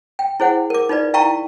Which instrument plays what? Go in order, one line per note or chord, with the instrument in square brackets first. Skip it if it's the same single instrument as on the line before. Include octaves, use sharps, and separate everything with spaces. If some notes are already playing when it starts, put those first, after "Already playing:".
[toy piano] G5
E4 G#4 C5 F#5
A#4 D6
D#4 F4 B4 D5
E4 F5 G5 A5 A#5 C#6